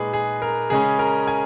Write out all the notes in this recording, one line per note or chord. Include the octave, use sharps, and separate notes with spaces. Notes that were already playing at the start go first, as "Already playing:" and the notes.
Already playing: A#2 G#3 D#4 G#4 B4
G#4
A#4
C#3 G#3 C#4 G#4
A#4
G#5